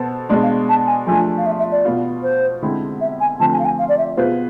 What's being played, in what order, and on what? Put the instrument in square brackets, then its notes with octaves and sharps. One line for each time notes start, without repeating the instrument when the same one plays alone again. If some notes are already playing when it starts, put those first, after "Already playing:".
Already playing: [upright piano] B2 B3 A4 C5
[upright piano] B2 G#3 D4 [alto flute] D5
[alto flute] F5
A5
G#5
[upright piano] F3 A3 D4 [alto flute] G#5
[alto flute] F5
E5
E5
D5
[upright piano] B2 B3 F4
[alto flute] C5
[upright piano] D3 G#3 C4 E4
[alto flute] E5
G#5
[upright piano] D3 F3 A3 C4 [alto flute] A5
[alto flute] G#5
F5
G#5
F5
D5
E5
[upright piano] B2 B3 F4 G#4 B4 [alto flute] C5